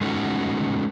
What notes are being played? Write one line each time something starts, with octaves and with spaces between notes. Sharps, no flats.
G#3 A3 B3 C#4 D#4 F#4